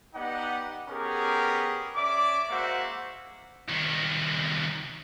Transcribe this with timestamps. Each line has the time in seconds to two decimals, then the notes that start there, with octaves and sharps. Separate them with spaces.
0.15 B3 D#4 G4 D5 F#5
0.88 B3 C#4 G4 G#4 A#4
1.96 C#4 D5 E5 D6
2.50 G#3 A#3 F#4 C5 E5 F#5
3.68 C2 D#3